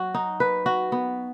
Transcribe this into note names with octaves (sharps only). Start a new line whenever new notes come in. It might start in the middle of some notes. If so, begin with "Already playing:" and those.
Already playing: F#3 F#4
D#4
B4
F#4
B3